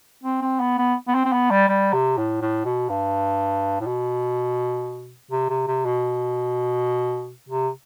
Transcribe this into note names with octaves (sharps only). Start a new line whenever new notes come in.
C4
C4
B3
B3
B3
C4
C4
B3
G3
G3
C3
A2
A2
B2
G2
A2
B2
C3
C3
C3
B2
C3